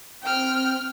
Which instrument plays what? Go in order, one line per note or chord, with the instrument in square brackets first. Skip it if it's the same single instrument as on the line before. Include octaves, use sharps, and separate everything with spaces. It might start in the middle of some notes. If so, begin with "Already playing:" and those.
[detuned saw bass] C4 [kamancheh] G5 F6